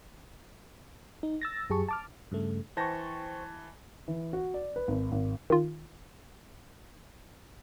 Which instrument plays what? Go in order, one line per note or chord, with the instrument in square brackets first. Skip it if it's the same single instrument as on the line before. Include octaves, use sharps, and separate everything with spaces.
[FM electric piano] D#4
E6 A6 A#6
F#2 F#3 G4 G#4 A5 C#6
A5 D6 F6
G2 C#3 A3
[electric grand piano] E3 A5 A#6 [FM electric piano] C5 G5 C#6
[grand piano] E3
F#4
D5
B4
G#1
G#1
[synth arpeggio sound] D#3 F4